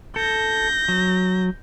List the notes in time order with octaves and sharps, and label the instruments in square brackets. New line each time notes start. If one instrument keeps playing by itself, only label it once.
[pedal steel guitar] A4 [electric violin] G6 A#6
[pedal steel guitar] F#3